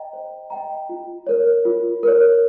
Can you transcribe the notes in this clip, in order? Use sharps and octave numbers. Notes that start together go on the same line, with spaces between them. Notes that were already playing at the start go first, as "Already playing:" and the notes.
Already playing: D#5 G5 A#5
C5
D#5 G5 A#5
F4
A#4 C#5
F4
A#4 C#5